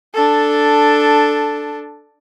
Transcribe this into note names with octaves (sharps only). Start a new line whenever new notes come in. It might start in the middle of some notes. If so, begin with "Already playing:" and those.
D4 A4